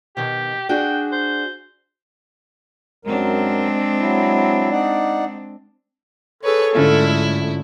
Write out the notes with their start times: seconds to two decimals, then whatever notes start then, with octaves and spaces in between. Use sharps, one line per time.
0.17 B2 D#3 G4
0.69 D4 F#4 G#4 G5
1.12 C5
3.05 F#2 F#3 G#3 C4 D4 A#4
3.99 F#3 E4
4.71 D#4 D5 F#5
6.43 G#4 A4 B4 C#5
6.75 G#2 D3 A3 C#4 E4 F4